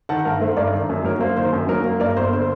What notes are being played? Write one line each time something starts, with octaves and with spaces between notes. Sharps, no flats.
D#3 F#5 A5
G2 A#4
A3 C5
G2 A#4 D5
D#3
F#2
F#3 A#4
A#3 C5
D#3 C5
F#2
F#3 A#4
A#3
G2 A#4 D5
G1 C5
D3 C5